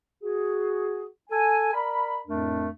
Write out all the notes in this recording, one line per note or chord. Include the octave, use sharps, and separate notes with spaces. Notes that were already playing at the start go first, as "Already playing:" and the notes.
F#4 G#4
A4 G#5
A#4 D5 B5
F2 A2 A3 D4 A#4